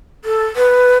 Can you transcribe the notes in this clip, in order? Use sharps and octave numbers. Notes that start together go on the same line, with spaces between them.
A4
B4